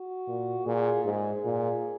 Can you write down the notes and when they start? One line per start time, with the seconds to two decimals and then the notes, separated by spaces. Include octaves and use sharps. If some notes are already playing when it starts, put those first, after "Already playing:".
Already playing: F#4
0.28 A#2
0.66 A#2 G#4
1.05 G#2 G#4
1.44 A#2